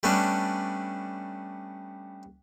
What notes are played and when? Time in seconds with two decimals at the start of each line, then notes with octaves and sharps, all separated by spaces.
0.03 G3 A3 B3 C#4 D4